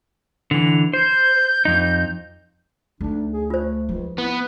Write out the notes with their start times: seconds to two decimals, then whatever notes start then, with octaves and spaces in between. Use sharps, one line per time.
0.51 D3 E3 F7
0.93 C5 G6
1.65 F2 D#4
3.01 D2 D4 D#4
3.32 G#4
3.50 A3 F4 C5
3.89 C#2 F3 D#4
4.18 B3 E4